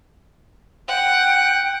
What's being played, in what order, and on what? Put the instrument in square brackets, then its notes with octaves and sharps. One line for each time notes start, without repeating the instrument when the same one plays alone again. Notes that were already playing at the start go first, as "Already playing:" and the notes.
[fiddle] F#5 [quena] G5